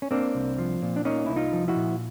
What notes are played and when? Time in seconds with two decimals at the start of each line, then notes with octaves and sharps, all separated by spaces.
0.02 C#4
0.11 A#3 C4 D4
0.35 C2
0.58 F3
0.82 A#2
0.96 D4
1.05 A#3 C#4 D#4
1.26 C2 E4
1.36 D#4 F4
1.53 F3
1.68 E4 F#4
1.76 A#2